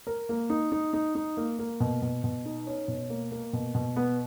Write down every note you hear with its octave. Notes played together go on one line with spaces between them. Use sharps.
A#4
A#3
D#4
D#4
D#4
D#4
A#3
A#3
B2
B2
B2
D#4
C#4
B2
A#3
A#3
B2
B2
B3